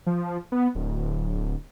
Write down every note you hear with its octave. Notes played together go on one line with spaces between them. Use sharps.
F3
B3
D1